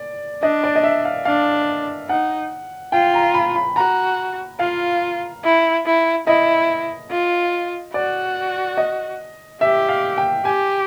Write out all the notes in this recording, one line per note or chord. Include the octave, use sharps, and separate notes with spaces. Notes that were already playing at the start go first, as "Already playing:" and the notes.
Already playing: D5
D4 D#5
D5
D#5
E5
F5
D4 F5
D#4 F#5
F4 G5
A#5
B5
B5
F#4 A#5
F4 F5
E4
E4
E4 D#5
F4
F#4 D5
D#5
G4 E5
F5
G5
G4 G#5